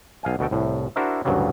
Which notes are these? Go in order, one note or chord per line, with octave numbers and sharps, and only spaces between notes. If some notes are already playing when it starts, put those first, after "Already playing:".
B1 F5 G#5
D2 B2 F#4 A4 G5
C2 A2
D4 E4 F#4 A#4 C5 E5
A1 D2 G2 C#3 F#3 G3